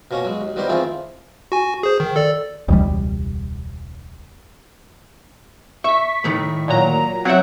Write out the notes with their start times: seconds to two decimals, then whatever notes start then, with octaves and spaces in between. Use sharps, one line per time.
0.11 B2 A#3 C#4 C#5 A#5
0.25 F#3 G#3
0.41 D#2
0.56 D#3 G3 B3 G4 A#4 C5
0.68 D#3 E3 A3 C4 F4 G#4
1.52 F#4 G#5
1.83 G#4 C5
2.00 D#3
2.16 A4 D5
2.68 E1 C#2 G3
5.84 E5 C#6 B6
6.24 A2 D#3 A3
6.68 A#2 F#3 A#5
7.25 F#3 C4 E5 F#5